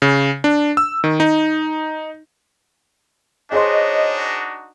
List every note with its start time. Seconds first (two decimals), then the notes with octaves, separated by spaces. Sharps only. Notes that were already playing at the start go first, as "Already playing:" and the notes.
0.02 C#3
0.44 D4
0.77 E6
1.04 D#3
1.20 D#4
3.52 D4 D#4 F#4 G#4 C5 C#5 D#5 C6